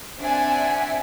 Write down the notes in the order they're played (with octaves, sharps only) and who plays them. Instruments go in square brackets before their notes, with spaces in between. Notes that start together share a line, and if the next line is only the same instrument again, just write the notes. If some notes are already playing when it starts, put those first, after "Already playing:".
[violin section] C4 D4 D5 E5 F#5 G#5